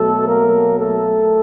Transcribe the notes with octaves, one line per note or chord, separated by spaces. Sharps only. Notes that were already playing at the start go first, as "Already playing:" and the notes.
Already playing: B2 F#3 A3 A4
A#3 A#4
A3 A4